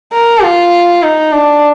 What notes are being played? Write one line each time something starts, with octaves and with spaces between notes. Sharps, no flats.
A#4
F4
D#4
D4